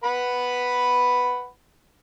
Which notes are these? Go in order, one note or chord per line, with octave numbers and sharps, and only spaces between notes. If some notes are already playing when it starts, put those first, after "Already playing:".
B4 F#5 B5